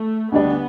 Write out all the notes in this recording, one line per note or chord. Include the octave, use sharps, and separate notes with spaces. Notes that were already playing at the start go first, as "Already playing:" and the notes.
Already playing: A3
D2 D3 G3 B3 D4